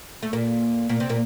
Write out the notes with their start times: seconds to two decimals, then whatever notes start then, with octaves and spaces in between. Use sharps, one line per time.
0.22 A3
0.33 A#2 A#3
0.89 A#2 A#3
1.00 C3 C4
1.09 A#2 A#3